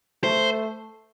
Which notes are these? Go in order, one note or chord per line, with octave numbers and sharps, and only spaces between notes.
A3 C5